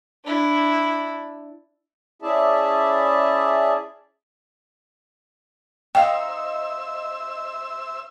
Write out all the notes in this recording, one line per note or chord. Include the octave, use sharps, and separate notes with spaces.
D4 E4
C#4 E4 G#4 D5 E5 A5
D#4 C5 E5 F5 G5 E6